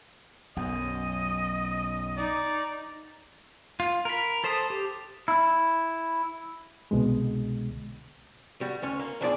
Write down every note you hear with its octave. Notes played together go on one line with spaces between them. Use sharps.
B1 F#2 D#5
D#4 D5
F4
A#4 B5
A4 C5 A5 C6 D#6
G4
E4
C2 B2 D3 G#3
G3 F#4
D2 C#4 C#5
A#3
B1 F2 D4 F4 G#4 D5